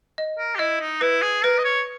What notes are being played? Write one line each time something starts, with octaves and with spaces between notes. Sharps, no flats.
D#5
A#4
G4
E4 D#5
D#4
E4 B4
G#4
A#4 B4
D#5
C#5